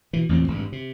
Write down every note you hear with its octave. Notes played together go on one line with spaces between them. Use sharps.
B2 E3
A1 E2 A#2 C4
G#1 G2
C3